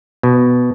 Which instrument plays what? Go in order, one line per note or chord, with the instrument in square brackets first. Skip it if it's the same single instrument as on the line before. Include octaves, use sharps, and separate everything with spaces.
[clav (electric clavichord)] B2